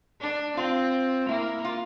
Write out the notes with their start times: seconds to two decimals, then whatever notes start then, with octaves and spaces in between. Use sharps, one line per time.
0.21 D4
0.57 C4 F4
1.29 A#3 E4
1.65 F4